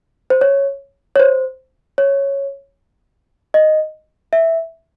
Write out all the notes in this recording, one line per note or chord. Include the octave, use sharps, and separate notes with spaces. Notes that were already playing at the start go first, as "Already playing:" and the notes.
C5
C#5
C#5
C5
C#5
D#5
E5